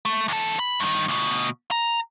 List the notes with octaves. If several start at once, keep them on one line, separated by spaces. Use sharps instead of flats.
A3
E2 A4
B5
G2 D#3
D2 B2
A#5